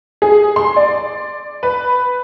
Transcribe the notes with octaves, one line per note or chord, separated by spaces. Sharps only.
G#4
C6
D5
B4